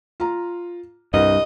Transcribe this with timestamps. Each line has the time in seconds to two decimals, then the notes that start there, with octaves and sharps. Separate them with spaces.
0.20 F4 A#5
1.14 C2 G2 D#5